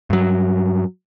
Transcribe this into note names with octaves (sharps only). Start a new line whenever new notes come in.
G2 F#3